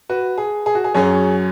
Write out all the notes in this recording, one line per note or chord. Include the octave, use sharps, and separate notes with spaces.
F#4 B4
G#4
G#4
F#4
G#4
F#2 F#3 C#4 G#4 C#5